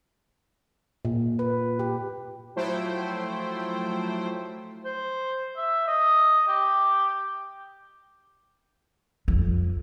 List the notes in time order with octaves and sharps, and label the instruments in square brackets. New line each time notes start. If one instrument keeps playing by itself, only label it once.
[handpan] A#2
B4
G4
[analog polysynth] F3 F#3 A3 E4 C5 G5
[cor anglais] C5
E5
D#5
G4
[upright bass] F2